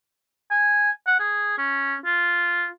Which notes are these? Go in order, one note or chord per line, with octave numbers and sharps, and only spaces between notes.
G#5
F#5
G#4
C#4
F4